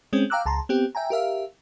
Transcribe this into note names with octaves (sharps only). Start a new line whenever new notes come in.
G#3 C4 C#4
F5 G5 A#5 D6 E6 F#6
C#2 A5 A#5 C6
B3 C4 G4
E5 G5 G#5 A#5
G4 A#4 E5 F5